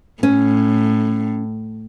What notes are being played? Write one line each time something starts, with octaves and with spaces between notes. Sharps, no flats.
A2 C#4